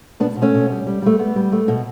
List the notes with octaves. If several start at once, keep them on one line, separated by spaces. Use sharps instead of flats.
B2 B3 D4
B2
A3 C#4
B2
G3
G3
G3 A3
G3 B3
G3
A3
B2